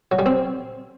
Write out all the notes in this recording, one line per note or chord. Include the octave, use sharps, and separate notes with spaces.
F#3
G3
C4